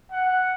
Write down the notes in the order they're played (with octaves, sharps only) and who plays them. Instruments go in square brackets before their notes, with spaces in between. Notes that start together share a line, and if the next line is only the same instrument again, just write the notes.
[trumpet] F#5